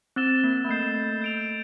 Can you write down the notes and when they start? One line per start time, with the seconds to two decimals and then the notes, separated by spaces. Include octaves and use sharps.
0.16 C4 E6 A6 E7 G7
0.44 A#3
0.65 A#3
0.69 A3 G6 C7 E7
1.22 G6 D7 F7